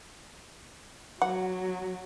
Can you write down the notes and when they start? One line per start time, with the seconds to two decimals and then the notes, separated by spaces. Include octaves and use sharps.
1.22 F#3 F#5